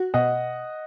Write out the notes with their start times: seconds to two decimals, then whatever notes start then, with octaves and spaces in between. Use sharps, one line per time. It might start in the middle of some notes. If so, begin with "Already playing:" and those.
Already playing: F#4
0.14 B2 D#5 F#5